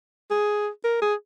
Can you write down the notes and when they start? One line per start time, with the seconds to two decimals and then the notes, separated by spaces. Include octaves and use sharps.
0.31 G#4
0.84 A#4
1.02 G#4